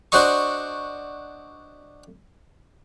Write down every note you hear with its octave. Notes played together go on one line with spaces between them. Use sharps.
D4 F#4 C5 D#5 C#6